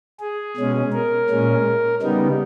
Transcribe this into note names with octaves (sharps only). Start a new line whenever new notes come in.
G#4
B2 G#3 C#4
A#4
A#2 G#3 C#4
C#3 G3 B3 D#4